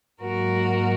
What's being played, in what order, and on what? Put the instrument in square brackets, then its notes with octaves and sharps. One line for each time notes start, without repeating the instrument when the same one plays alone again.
[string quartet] G#2 F#3 A#3 F#4 A#4